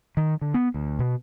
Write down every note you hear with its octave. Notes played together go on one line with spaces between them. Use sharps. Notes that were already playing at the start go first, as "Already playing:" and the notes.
D#3
D3
B3
D2
B2